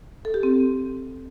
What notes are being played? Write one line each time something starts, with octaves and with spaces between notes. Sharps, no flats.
A4
G4
C4